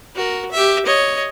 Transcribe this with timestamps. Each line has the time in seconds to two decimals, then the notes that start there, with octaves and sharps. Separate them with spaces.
0.15 F#4 A#4
0.52 G4 E5
0.86 C#5 D#5